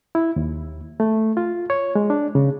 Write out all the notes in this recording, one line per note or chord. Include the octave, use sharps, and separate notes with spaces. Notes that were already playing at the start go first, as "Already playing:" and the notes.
E4
D#2
A3
F4
C#5
G#3
D4
C#3